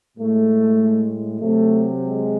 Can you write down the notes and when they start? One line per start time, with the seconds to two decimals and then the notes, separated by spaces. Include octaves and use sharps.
0.17 A2 G#3 A3
1.40 C3 F#3 A3
2.02 G#3